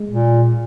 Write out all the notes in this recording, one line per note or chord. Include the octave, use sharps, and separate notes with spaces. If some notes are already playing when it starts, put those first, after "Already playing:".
Already playing: G#3
A#2